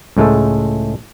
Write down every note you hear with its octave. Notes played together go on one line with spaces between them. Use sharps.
C#2 A2 G#3 A3 A4